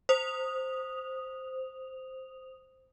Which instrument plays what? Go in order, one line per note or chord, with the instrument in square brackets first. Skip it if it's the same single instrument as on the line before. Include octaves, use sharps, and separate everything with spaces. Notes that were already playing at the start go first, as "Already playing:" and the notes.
[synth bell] C5 D#6 F7